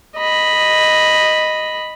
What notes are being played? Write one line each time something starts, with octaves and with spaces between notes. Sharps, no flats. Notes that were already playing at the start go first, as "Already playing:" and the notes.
D#5 B5